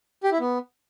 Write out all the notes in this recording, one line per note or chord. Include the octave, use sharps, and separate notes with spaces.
G4
E4
B3